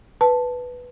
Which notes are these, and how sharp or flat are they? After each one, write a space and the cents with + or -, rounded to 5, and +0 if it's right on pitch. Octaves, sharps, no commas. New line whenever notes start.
B4 +0 A5 +0